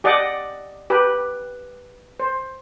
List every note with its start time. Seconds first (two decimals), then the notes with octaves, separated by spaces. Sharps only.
0.04 G4 D5 D#5 F#5
0.90 G4 B4
2.20 C5